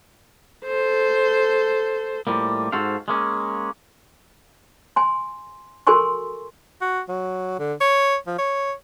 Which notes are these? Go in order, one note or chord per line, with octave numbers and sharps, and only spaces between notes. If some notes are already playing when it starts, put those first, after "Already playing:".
A4 C5
A2 F3 G3 A#3
G#2 F#4 A4 C5 F5
G#3 A#3 C#4
G#5 C6
F#4 A4 A#4 G#5 C6 C#6
F#4
F#3
D3
C#5
F3
C#5